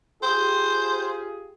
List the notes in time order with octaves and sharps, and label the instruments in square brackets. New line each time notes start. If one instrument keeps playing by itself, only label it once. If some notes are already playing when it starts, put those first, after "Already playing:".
[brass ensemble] F4 G4 G#4 [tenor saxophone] C5